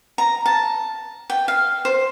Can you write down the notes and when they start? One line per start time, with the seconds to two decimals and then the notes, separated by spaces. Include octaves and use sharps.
0.18 A#5
0.46 A5
1.30 G5
1.48 F5
1.85 C5